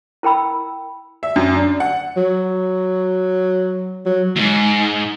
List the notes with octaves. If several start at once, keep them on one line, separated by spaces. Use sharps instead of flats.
E4 A#4 G5 B5 E6
E5
F#2
D4
F#5
F#3
F#3
D#2 G#2